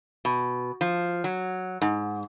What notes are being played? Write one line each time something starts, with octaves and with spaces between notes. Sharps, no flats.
B2
F3
F#3
G#2